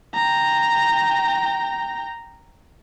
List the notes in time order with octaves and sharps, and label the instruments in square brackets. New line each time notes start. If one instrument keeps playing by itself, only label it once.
[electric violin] G5 A#5